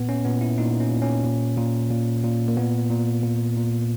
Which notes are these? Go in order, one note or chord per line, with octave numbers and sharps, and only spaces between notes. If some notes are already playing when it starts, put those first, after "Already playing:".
Already playing: A#2 B3
C#4
A#2 B3
E4
A#2 D#4
C#4
A#2
C#4
A#2
A#2
A#2
A#2
A#3
A#2 B3
A#2
A#2
A#2